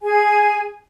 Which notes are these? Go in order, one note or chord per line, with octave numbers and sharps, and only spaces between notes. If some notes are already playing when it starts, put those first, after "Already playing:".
G#4 G#5